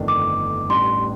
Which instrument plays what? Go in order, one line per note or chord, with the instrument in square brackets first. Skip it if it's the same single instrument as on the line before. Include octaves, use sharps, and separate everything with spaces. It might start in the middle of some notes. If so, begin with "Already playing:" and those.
Already playing: [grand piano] G1 F2 D#3 A3 D4
[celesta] D6
[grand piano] A1 A2 G3 D4 [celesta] C6